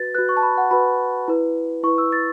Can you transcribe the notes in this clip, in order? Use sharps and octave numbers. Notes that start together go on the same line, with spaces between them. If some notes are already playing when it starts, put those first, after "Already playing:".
Already playing: F#4 B4 A6
F#4 B4 F#6
C#6
A5
B5
F#5
F#4 B4 B5
E4 B4
E4 B4 C#6
E6
A6